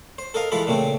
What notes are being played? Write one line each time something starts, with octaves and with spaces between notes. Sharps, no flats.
C5
A4 A#4 D#5 F5
E3 G#3 F4 A4 B5
A#2 C#3 A3 C4